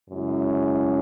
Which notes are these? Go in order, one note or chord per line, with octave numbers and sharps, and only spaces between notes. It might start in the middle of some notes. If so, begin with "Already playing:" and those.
F#2 C#3 G#3 C#4 E4